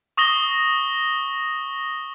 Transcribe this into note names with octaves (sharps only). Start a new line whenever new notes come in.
C#6 D#6 A#6 G7